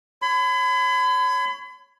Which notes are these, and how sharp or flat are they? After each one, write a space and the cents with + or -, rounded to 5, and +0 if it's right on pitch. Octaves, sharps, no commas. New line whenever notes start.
C#5 +0 B5 +40